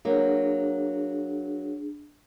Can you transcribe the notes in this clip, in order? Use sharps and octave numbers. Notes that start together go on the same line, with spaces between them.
F#3 A#3 D4 G#4